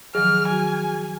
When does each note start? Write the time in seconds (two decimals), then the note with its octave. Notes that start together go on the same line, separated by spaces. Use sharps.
0.15 D#3 F3 F#3 G#4 F6
0.47 F#3 F#4 G#5